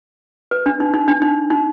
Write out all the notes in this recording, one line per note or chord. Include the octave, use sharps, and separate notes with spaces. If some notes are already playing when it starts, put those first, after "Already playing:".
B4
D4
D#4
D#4
D4
D#4
D#4